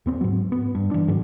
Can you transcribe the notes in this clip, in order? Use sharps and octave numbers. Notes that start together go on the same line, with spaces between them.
D#2 B3 C4
G#2 F#3
B3
G2
E3 D4
G#2 D#3 F#3